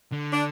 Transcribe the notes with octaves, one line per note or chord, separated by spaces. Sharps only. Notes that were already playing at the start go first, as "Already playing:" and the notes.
D3
D4